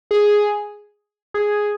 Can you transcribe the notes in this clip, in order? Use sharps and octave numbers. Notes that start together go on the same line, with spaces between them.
G#4
G#4